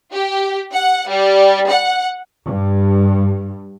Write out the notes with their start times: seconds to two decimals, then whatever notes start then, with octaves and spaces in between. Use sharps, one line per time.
0.13 G4
0.73 F#5
1.09 G3
1.70 F#5
2.46 G2